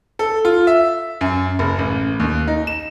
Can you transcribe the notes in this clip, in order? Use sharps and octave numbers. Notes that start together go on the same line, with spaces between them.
A4
F4
E5
F#2
F#1
A1
D#2
D#4
E7